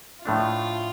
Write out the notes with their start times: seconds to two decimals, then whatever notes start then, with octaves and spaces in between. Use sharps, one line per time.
0.25 A2 F3 A3 D4 F4